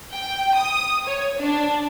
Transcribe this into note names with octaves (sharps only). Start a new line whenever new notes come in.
G5
D#6
C#5
D4